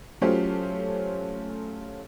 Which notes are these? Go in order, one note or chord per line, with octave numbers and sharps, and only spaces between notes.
F#3 A3 C#4 F4 G4 C5